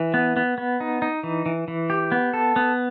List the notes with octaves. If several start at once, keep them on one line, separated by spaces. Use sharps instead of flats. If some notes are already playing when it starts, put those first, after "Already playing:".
Already playing: E3
B3
B3
B3
D#4
D#4
E3
E3
E3
G4
B3
A4
B3